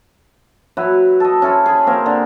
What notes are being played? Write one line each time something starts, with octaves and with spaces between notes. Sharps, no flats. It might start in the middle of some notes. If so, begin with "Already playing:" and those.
F#3 E4 B4
A4 D#5
C#4 E4 A4 C5
G#4 B5
A#3 C4 A#4
D3